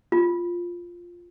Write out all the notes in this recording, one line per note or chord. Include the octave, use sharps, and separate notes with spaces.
F4